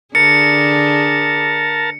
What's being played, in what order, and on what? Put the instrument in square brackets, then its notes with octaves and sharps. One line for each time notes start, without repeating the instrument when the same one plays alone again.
[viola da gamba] D3 D4 G#4 [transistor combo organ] A#4 A5 [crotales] C#7